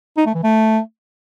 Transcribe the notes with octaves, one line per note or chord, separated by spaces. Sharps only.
D#4
A3
E3
A3